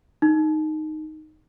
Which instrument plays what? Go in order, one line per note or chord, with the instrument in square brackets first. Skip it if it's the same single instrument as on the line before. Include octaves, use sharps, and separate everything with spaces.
[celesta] D#4